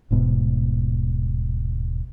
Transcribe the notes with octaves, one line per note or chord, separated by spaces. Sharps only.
D#1 G#2 B2